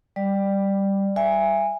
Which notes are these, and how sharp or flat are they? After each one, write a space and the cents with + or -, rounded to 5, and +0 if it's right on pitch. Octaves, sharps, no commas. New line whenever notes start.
G3 +0 D5 +15
E5 +25 G#5 -15